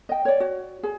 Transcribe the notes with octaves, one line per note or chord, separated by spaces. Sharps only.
D#5 G5
C#5 D5
F#4
G#4